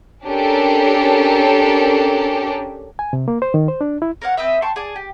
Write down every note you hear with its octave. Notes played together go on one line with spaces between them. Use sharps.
C#4 D4 G4 A4 A#4
G#5
C3
A#3
C5
D#3
C5
D4
E4
A#4 C#5 F5 F#5
C4 B4 D#5 E5
G5 A5 C6 C#6
G#4 D5 G#5 A5
G4